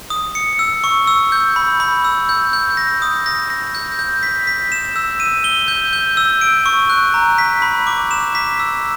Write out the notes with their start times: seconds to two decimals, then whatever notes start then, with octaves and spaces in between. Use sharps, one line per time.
0.10 D#6
0.35 C#7
0.59 E6
0.84 C#6
1.07 E6
1.32 G6
1.56 B5
1.80 B5
2.04 E6
2.29 G6
2.53 G6
2.77 A#6
3.02 D#6
3.26 A#6
3.50 A#6
3.75 G6
3.99 G6
4.23 B6
4.47 B6
4.72 E7
4.96 E6
5.20 D#7
5.44 G7
5.68 G6
5.93 G6
6.17 E6
6.41 D7
6.66 C#6
6.90 F#6
7.14 A#5
7.38 B6
7.62 B5
7.87 D6
8.11 E7
8.35 B6
8.60 E6